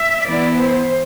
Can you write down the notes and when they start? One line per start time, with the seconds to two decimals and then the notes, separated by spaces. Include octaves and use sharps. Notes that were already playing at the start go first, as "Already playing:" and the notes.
Already playing: E5
0.25 E3 B3 E4 D5
0.56 C5